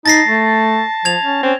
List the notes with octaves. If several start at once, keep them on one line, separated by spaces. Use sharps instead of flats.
D#4 A5 A6 A#6 C7
A3
F3 G#6 F7
C#4
C4 C#4